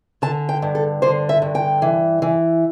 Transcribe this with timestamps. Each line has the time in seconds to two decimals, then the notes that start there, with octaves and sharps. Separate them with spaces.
0.22 D3 A5
0.49 G5
0.62 G2
0.75 A4
1.02 D3 C5
1.29 E5
1.42 G2
1.55 G5
1.82 E3
2.22 E3